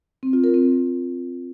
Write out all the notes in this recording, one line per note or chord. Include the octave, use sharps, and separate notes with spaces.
C4
F4
A#4
C4